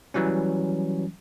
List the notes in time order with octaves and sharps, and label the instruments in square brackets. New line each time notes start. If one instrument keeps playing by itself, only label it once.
[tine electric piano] E3 F#3 G3 C#4